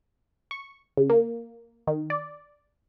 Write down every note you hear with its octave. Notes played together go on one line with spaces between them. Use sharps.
C#6
C#3
A#3
D#3
D5